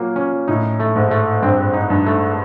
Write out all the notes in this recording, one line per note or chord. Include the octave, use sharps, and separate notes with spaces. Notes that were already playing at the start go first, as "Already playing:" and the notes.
Already playing: A#2 F#3 A#3
C#4
A2 D#4
A3
G#2
A3
G2 C4
D#4
G2
A3